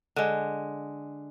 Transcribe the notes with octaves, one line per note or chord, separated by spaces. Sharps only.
D3 G#3